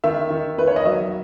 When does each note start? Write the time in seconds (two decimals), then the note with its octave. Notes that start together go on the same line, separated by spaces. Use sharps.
0.04 D#3 E5
0.31 D#3
0.58 D#3 B4
0.67 C#5
0.76 D#5
0.85 F#3 E5